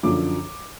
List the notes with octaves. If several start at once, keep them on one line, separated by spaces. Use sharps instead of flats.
F#2 D3 F3 D6